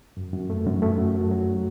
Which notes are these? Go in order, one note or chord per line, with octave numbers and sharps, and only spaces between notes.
F#2
F#2
A3
F#2
A3
F#2
F#3
F#3